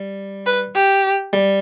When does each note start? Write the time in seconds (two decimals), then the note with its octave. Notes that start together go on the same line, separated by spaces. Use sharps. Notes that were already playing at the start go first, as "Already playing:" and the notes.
Already playing: G3
0.46 B4
0.75 G4
1.33 G3